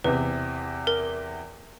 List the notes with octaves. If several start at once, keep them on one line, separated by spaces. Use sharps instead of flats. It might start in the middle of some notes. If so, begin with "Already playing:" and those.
E2 C3 B4
A#4